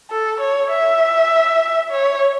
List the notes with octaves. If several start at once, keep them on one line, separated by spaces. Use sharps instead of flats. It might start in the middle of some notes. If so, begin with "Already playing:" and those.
A4
C#5
E5
C#5